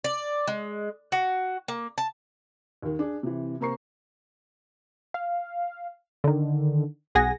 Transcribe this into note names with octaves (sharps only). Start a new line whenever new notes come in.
D5
G#3
F#4
A#3
A5
D#2 D#3
D4 G#4
C3 E3
C3 A#3 C5 A#5 C#6 C7
F5
D3 D#3
B1 G#4 F#5 G#5 A#6